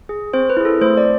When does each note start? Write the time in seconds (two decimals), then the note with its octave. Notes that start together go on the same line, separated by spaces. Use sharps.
0.09 G#4
0.34 C4 C5
0.50 B4
0.57 E4 G#4
0.65 A4
0.81 A3 C5
0.97 D5